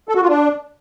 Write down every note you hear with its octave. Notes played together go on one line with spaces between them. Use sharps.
A4
F#4
F4
D4